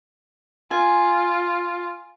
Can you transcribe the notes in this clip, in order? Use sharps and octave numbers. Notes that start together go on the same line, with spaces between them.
F4 G#5